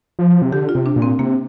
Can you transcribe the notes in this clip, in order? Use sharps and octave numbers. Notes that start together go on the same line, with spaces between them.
F3
C3
D3 G4
F4
C3
D4
A#2
C4
C3 A#3